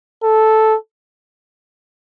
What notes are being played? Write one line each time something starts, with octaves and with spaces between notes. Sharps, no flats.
A4